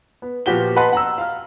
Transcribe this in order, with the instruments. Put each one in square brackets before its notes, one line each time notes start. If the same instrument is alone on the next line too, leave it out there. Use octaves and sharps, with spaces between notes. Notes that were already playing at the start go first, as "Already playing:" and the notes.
[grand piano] B3
A#2 F3 B3 F#4 G4 G7
B4 D#5 F#5 A5 B5 C6
F#5 A#5 E6
F5 F6